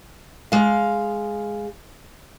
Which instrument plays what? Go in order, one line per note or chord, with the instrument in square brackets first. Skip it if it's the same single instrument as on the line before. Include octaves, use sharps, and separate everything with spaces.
[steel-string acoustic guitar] G#3 F5